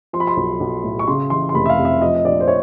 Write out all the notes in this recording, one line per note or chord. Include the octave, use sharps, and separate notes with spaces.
F3 C6
B5
C6
B1
B1
A2
C#6
C#3 C6
E3 C6
C6
F1 B5
E5
F5
F2
E5
F3 D#5
D#5
A#1 D5
C5
C#5